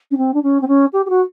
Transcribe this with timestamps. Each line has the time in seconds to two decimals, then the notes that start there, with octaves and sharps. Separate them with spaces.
0.11 C#4
0.17 C4
0.34 D4
0.43 C#4
0.61 C4
0.68 C#4
0.93 G4
1.05 G4
1.09 F#4